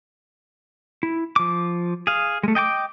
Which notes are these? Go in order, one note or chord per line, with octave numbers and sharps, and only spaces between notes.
E4
F3 D6
G#4 F5
G#3 A3
D#5 G5 A5 D6